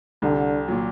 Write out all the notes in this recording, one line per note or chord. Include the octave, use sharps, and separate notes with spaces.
C2 D3
A#2 F#3